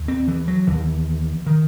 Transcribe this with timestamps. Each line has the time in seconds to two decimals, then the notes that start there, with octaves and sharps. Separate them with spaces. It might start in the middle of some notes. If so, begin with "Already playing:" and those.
Already playing: D#2
0.08 C4
0.28 E3
0.48 F#3
0.67 D#2 E3
1.46 D#3